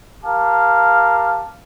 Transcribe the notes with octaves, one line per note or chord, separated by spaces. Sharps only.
G4 A#4 F5 A5